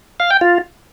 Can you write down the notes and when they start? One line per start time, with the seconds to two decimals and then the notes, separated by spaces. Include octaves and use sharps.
0.20 F5
0.31 G5
0.41 F4